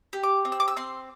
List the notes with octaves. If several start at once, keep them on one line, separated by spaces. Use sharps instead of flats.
G4
D6
C4
E6
D6
E6
C4 C6